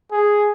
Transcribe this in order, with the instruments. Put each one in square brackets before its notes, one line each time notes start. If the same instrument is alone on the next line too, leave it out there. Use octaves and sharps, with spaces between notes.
[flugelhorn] G#4